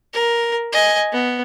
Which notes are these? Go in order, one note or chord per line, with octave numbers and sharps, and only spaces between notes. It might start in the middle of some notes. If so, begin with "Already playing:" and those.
A#4
D#5 G#5
B3